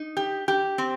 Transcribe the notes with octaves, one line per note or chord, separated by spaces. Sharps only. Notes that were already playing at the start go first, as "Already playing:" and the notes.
Already playing: D#4
G4
G4
C4